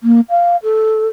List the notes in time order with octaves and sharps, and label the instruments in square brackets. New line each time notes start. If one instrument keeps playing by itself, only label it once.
[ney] A#3
F5
A4